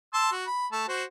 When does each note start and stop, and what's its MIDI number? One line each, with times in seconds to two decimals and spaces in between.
0.14 0.31 81
0.14 0.31 84
0.14 0.31 88
0.32 0.45 66
0.47 0.67 83
0.72 0.83 57
0.72 0.83 81
0.72 0.83 88
0.88 1.04 66
0.88 1.04 72